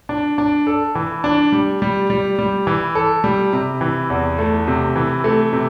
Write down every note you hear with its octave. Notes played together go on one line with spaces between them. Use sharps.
D4
D4
A4
E3
D4
G3
G3
G3
G3
E3
A4
G3
C3
E3
E2
A3
C3
E3
A3
C3